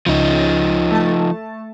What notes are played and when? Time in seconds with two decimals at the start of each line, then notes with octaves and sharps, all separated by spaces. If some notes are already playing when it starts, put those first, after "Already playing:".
0.06 C#2 C#3 F3 D#4
0.91 A3 A5